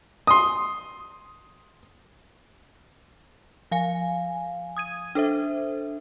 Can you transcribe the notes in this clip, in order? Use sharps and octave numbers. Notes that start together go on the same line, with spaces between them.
C6 D#6
F3 F5 G#5
D#6 G#6 D#7
D4 A4 C5 E5